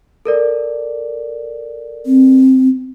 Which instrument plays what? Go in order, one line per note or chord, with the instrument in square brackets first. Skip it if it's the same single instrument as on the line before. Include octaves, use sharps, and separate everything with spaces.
[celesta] A4 A#4 D5
[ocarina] C4